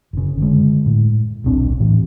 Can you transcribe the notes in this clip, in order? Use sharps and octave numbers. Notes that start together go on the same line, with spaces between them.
F#1 C#3
D3 G#3
A2
D#1 B1 C4 D4
A2 E3